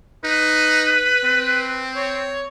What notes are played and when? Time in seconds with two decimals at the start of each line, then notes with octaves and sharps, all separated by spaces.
0.24 D#4 B4
1.24 C4
1.96 C#5